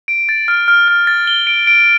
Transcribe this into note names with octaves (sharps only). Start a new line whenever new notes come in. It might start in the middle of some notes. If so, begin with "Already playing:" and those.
D7
A6
F6
F6
F6
A6
G7
D7
D7